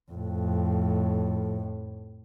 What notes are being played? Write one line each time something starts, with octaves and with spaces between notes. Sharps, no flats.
F2 A2